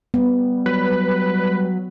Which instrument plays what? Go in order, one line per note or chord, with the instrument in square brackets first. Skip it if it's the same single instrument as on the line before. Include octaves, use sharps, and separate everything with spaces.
[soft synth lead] G3 [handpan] B3
[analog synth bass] F#3 [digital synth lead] B4